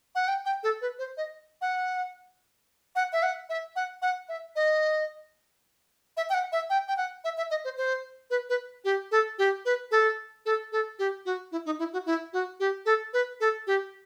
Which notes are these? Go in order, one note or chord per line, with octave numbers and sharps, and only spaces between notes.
F#5
G5
G5
A4
B4
C5
D#5
F#5
F#5
E5
F#5
E5
F#5
F#5
E5
D#5
E5
G5
F#5
E5
G5
G5
F#5
E5
E5
D#5
C5
C5
B4
B4
G4
A4
G4
B4
A4
A4
A4
G4
F#4
E4
D#4
E4
F#4
E4
F#4
G4
A4
B4
A4
G4